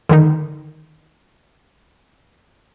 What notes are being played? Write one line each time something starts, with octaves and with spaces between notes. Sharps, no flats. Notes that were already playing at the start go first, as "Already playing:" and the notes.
D3 D#3 D#4